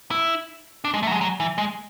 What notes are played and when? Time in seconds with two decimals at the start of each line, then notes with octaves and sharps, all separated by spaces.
0.11 E4
0.84 D4
0.94 G#3
1.03 A3
1.07 F#3
1.12 G#3
1.21 F#3
1.40 E3
1.58 G#3